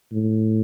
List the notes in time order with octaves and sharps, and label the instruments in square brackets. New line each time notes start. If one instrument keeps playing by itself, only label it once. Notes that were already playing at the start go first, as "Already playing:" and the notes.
[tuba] A2